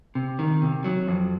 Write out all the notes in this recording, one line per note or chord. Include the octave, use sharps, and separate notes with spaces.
C3
D#3
C3
F#3
F2